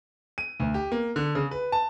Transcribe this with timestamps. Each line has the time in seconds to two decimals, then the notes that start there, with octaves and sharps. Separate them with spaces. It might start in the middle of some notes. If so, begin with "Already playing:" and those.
0.38 D#7
0.60 D2
0.74 G4
0.92 A#3
1.16 D3
1.35 C#3
1.51 B4
1.72 A5